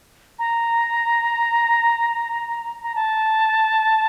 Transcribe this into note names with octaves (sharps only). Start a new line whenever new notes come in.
A#5
A#5
A5